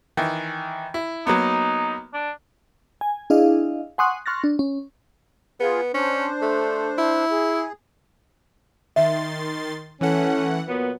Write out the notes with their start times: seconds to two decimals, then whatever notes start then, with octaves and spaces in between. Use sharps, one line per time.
0.17 D#3 E3
0.94 E4
1.27 F#3 A#3 B3 D#4
2.14 D4
3.01 G#5
3.30 D4 E4 G#4 D#5 F5
3.98 F#5 G#5 C6 C#6 D#6 F#6
4.26 C6 C#6 F6 F#6 A6 A#6
4.44 D4
4.59 C#4
5.60 B3 F4 G#4
5.94 C#4 D4 C5
6.42 A3
6.98 E4
7.31 G#4
8.96 D#3 E5 C6 A6
10.01 E3 A3 C#4 F#5
10.68 A#2 F#3 B3